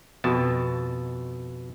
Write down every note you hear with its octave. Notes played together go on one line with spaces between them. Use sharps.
F2 B2 A5